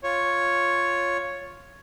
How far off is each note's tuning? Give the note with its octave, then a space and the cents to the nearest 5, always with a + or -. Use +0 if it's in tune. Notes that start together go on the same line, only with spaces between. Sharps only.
F4 +0 C#5 +0